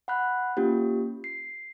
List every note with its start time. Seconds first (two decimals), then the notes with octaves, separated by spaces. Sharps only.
0.08 F#5 B5 F#6
0.57 A#3 C#4 F4 G4
1.24 C7